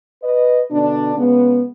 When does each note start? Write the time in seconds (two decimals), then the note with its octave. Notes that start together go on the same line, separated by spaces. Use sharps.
0.23 B4 D#5
0.71 B2 D3 D4
1.18 C#3 G#3 B3